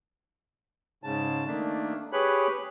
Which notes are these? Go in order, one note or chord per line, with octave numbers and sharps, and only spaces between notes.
G#2 C#3 A5
D#3 A3 A#3 D4
G4 G#4 B4 C#5 B5 F#6